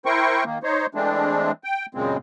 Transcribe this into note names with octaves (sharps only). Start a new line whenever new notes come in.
E4 A#4 C5 G5 C#6
D#3 A#3
D#4 C5 C#5
E3 G#3 A3 C4 D4
G5
F#2 A#2 C#3 G#3 C4